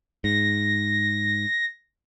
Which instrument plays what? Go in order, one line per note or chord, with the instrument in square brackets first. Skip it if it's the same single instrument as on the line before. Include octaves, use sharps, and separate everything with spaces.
[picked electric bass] G#2 [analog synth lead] A#6